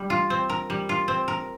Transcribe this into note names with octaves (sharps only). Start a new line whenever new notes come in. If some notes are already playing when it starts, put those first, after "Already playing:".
Already playing: G3
F4
C4
A#4
G3
F4
C4
A#4